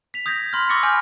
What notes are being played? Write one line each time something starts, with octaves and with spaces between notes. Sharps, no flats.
B6 F7
D#6 G6 G#6 A#6 B6
B5 C6 F6
C#6 D6 E6 A6 A#6 C#7
G#5 B5 F6 G6